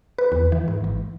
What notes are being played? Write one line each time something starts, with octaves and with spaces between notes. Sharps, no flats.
B4
E2
E3
G#2
G#1